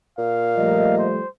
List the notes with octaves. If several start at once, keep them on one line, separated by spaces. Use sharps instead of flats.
A#2 F5
F3 G3 A3 A#3 D#5
C5